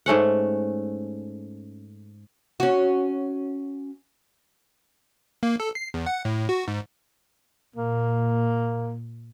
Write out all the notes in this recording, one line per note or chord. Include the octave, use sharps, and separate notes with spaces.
G#2 A3 C#4 F#5
C#4 F#4
A#3
A4
C7
E2
F#5
A2
F#4
G#2
A#2 A#3